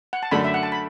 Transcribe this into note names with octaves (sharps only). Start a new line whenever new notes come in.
F#5
A5
F#2 D3 A3 D4 A4 B5
E5
F#5
A5
B5